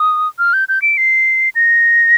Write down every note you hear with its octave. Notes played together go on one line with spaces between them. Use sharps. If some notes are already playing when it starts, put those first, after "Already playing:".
Already playing: D#6
F6
G6
G6
D7
C7
A#6